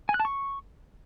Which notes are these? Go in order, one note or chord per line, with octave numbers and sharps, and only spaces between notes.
G#5
F#6
A5
C#6